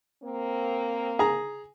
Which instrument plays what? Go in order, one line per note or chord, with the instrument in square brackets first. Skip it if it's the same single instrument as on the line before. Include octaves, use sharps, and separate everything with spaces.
[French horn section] A#3 C4
[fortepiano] G#4 A#5